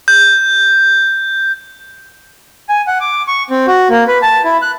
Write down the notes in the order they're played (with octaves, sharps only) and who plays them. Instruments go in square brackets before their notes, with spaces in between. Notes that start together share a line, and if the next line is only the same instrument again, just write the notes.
[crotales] G6
[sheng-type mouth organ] G#5
F#5
D6
C#6
C4
F#4
A#3
B4
A5
E4
F#6